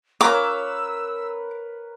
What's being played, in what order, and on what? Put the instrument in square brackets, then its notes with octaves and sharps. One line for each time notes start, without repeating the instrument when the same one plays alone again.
[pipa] C#4 F4 A#5 [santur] A#4 B4 C#5 [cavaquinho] D6 [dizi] E6